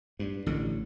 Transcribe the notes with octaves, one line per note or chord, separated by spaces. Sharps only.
G2
A1 D3